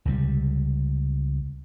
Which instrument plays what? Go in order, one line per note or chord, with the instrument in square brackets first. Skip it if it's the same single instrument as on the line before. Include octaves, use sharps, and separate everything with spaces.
[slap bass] C#2 C3 D#3 G3